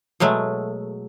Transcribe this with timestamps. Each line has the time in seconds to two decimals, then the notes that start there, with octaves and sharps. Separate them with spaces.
0.20 B2 F#3 G#3 A3